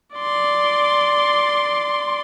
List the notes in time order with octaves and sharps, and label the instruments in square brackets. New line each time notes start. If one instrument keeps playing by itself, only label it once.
[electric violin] D5 C6